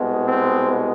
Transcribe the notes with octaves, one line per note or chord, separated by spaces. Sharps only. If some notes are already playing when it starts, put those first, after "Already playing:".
Already playing: C2 B2 G#3 B3
C4